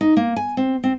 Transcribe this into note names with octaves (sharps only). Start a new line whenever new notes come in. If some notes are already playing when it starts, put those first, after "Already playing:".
D#4
A#3
G#5
C4
C4